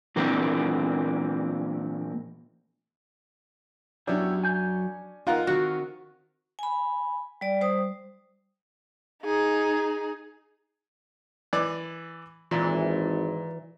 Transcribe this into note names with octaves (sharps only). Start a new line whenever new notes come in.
A#2 E3 A#3 C4 D4 G4
F#2 F#3 B3 C#4 D4 E4 G4
G#5 G6
F2 D#4 F4 A#4 F#5
D#3 C4 F#4
G#5 B5
G3 D5
G3 C5 D#6
D#4 G#4
E3 D5
G#1 A#2 E3